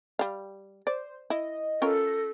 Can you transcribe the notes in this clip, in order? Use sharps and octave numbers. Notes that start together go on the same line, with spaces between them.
G3 F5
C5 D5
E4 D#5
C#4 F4 A4 A#4
A#6